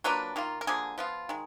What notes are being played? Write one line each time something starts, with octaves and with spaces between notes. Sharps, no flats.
F#3 A#3 D4 F4 B4
D#3 A#3 F4
A#4
D3 F3 A#3 G#4
F3 B3 F4
D#3 G#3